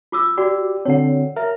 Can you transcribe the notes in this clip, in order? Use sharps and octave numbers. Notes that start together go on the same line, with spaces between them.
F4 D6 E6
F#4 G4 D5
D3 C4 C#5 F#5
A#4 E5